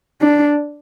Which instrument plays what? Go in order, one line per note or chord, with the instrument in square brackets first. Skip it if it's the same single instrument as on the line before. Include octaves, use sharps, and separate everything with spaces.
[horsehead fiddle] D4